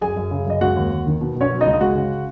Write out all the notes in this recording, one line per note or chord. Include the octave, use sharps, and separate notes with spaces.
F#2 G#4 G#5
F#2
C#3
F#2 D#5
G#3 F#4 F#5
D#2
D#2
D#3
B2
B2 C#4 C#5
F#3
D#4 D#5
C#2
D#5
G#3 F#4 F#5
C#3